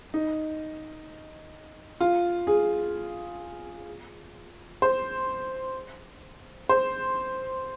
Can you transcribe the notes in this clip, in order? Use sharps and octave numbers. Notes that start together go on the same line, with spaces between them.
D#4
F4
G#4
C5
C5